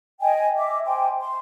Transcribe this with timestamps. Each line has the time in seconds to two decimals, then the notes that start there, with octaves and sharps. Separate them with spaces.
0.21 D#5 G5 G#5
0.56 D#5 E5 D6
0.85 C5 G5 G#5 C6
1.19 C6